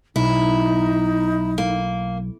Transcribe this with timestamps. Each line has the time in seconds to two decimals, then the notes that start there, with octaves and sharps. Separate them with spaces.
0.16 B1 D#4 E4
1.58 A#3